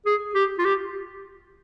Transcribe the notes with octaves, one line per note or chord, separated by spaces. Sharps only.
G#4
G4
F4
G4